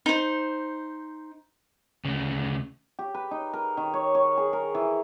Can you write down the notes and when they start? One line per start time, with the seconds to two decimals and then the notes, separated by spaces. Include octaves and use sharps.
0.06 D#4 C5
2.05 D2 C#3
2.99 G4
3.14 B4
3.31 D#4
3.53 A#4
3.77 D#3
3.94 C#5
4.15 C#5
4.38 G#4
4.53 A#4
4.75 E3